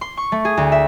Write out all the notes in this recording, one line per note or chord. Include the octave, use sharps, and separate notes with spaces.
C6
C#6
A3
G#4
D2
E5